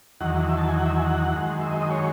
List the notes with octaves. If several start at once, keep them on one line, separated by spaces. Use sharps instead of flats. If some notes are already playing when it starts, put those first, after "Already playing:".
E2 D#3 F#3 F#5
E5
A5
G#5
F#5
E5
G#5
F#5
F#2 D#3 G#3
E5
D#5
D#5
C#5